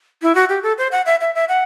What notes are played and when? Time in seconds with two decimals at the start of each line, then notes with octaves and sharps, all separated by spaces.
0.22 E4
0.35 F#4
0.49 G4
0.63 A4
0.78 C5
0.92 F#5
1.06 E5
1.21 E5
1.35 E5
1.49 F#5